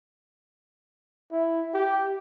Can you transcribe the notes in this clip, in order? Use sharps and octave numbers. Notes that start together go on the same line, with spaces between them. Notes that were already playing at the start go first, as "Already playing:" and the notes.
E4
G4